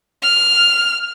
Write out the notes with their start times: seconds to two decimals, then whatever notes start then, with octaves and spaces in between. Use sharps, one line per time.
0.22 F6